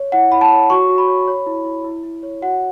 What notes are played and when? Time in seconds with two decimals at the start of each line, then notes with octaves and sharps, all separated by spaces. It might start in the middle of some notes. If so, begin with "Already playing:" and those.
Already playing: C#5
0.12 E4 F#5
0.32 E4 B5
0.41 A5
0.51 C#5
0.70 F#4 C#6
0.89 F#4
0.98 B5
1.08 C#5
1.28 C#5
1.46 E4
1.65 E4
1.84 E4
2.03 E4
2.23 C#5
2.42 F#4 F#5